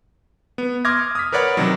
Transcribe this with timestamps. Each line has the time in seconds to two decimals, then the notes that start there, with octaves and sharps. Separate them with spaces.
0.58 B3
0.85 C6 D6 D#6 F6 G#6 A#6
1.15 D#6 F6 B6
1.32 A#4 B4 C#5 D5 F#5 B5
1.57 C3 D#3 F#3